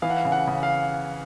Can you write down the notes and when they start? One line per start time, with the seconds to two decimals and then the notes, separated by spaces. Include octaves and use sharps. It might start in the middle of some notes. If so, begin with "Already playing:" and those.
0.02 E3 F5
0.10 F#5
0.17 F5
0.25 C#3
0.32 F#5
0.47 C#3
0.63 F5